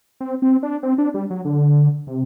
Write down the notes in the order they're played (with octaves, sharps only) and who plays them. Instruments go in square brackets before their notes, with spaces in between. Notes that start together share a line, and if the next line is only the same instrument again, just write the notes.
[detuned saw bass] C4
C4
D4
C4
D4
G3
F#3
D3
C3